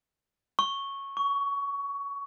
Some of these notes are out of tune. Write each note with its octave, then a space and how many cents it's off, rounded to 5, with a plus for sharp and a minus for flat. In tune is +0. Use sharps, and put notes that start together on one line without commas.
C#6 -10
C#6 +20